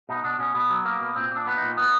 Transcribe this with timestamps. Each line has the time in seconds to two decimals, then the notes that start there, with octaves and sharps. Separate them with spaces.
0.09 B2 D#4
0.24 B2 D4
0.39 B2 C#4
0.54 B2 B3
0.70 F#3
0.85 A#3
1.01 B2
1.16 A#2 C4
1.31 A#2
1.36 D4
1.46 B3
1.57 A#2 D#4
1.77 B3